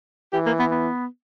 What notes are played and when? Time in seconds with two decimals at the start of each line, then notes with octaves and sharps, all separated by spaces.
0.33 E3 G4
0.46 A#3
0.59 B3
0.71 B3